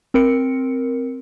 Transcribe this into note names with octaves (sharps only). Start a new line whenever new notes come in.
C4 A#4 C#7